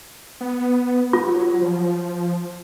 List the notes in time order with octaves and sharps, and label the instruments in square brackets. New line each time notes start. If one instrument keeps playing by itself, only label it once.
[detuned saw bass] B3
[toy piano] F4
[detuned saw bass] F#3
F3